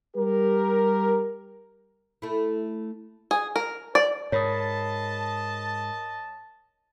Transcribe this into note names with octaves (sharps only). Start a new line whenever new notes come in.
G3 G4 A#4
A3 E4
G#4
A#4
D5
G#2 A#4 C#5 D#5 A5 B5 D#6